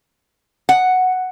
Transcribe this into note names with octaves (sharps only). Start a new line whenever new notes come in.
F#5